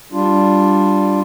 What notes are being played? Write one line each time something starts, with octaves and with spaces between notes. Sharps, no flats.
G3 D4 F4